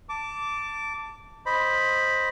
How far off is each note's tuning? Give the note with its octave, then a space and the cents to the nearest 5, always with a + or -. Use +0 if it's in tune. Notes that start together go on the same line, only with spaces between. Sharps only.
A5 +15 D6 -15
C5 +5 D#5 +0 B5 +0